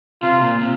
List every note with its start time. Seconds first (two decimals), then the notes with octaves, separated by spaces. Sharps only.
0.22 C3 F4
0.41 A#2
0.61 C3